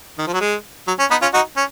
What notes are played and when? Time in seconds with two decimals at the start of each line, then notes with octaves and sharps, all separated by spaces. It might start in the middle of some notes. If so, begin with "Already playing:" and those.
0.18 D#3
0.27 F3
0.33 F#3
0.41 G#3
0.88 F#3
0.99 C#4
1.11 B3 D#4
1.22 C#4 F4
1.33 D#4 F#4
1.56 C#4